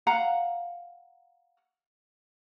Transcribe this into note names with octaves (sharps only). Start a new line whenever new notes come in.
F5 F#5 A#5